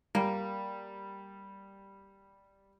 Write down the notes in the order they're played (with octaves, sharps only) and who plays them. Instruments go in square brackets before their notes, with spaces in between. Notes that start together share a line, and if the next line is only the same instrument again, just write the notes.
[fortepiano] G3 [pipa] A#3